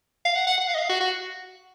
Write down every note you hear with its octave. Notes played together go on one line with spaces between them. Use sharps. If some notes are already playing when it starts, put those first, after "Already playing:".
F5
F#5
F#5
F#5
F5
D#5
F5
F#4
F#4